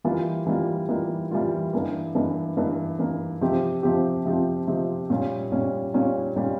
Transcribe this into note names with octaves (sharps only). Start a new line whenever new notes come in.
E3 G3 A#3 F4
E3 G3 A#3 F4
E3 G3 A#3 F4
E3 G3 A#3 F4
G2 E3 A#3
G2 E3 A#3
G2 E3 A#3
G2 E3 A#3
C3 F3 C4 G4
C3 F3 C4 G4
C3 F3 C4 G4
C3 F3 C4 G4
A#2 G3 C#4
A#2 G3 C#4
A#2 G3 C#4
A#2 G3 C#4